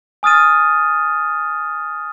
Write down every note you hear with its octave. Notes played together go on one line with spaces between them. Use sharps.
G#5 D#6 F6 A6 D#7